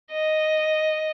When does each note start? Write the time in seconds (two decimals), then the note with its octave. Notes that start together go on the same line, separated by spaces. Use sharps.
0.12 D#5